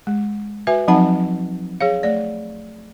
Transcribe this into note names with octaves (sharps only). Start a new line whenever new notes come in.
G#3
F#4 B4 E5 G#5
F3 F#3 C4 D#4 F#5 A5
G#4 C#5 F5
A3 D5